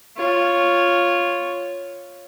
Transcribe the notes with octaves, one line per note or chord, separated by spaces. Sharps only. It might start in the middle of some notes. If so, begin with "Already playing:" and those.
F4 C#5